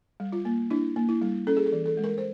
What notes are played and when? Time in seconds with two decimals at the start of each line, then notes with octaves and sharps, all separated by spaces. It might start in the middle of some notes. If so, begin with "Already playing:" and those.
0.20 G3
0.32 F4
0.45 A#3
0.70 D4 E4
0.96 A#3
1.09 E4
1.22 G3
1.47 C#4 A4
1.57 G#4
1.66 A4
1.72 E3
1.86 A4
1.97 G#3
2.04 A#4
2.18 C5